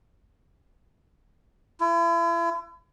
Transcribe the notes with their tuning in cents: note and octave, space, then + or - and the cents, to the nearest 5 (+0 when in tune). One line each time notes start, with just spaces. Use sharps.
E4 +40